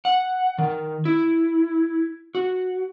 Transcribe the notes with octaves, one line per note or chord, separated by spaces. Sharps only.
F#5
D#3
E4
F#4